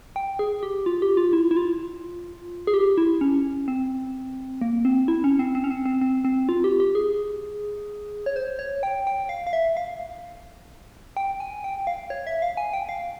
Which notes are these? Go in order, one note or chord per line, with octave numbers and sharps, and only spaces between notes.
G5
G#4
G4
F4
G4
F4
E4
E4
F4
G#4
G4
E4
C#4
C4
A#3
C4
E4
C#4
C4
C4
C#4
C4
C4
C4
C4
F4
G4
G4
G#4
C#5
C5
C#5
G5
G5
F5
F5
E5
F5
G5
G#5
G5
F5
C#5
E5
F5
G#5
G5
F5